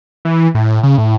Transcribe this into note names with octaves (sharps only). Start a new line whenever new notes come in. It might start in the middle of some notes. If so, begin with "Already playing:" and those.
E3
A2
C#3
A2